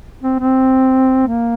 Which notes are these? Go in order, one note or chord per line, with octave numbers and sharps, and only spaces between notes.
C4
C4
A#3